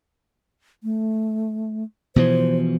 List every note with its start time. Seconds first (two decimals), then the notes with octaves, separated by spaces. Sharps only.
0.84 A3
2.16 B2 E3 F3 C5